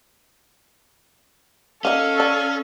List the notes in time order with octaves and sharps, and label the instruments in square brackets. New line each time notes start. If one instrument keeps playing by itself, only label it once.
[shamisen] A#3 D#4 [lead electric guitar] C#4 [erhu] A4 [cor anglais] F5
[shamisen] D4